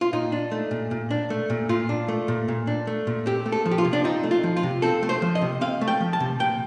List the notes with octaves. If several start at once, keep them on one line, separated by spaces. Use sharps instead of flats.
F4
A#2 D#4
D4
A3
A#2
A#2
D4
A3
A#2
A#2 F4
D4
A3
A#2
A#2
D4
A3
A#2
C4 G4
A3
A4
F3
G4
F4
C3
D4
C4 D#4
A3
F4
F3
F4
C3
C4 A4
A3
C5
F3
D#5
C3
C4 F5
A3
G5
F3
A5
C3
A#2 G5